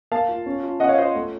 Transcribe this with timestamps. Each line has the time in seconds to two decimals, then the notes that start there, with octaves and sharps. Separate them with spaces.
0.12 A#3 F5 A5
0.29 F4
0.46 C#4
0.63 F4
0.80 C#4 D#5 F#5
0.89 C#5 F5
0.97 F4 C5 D#5
1.15 A3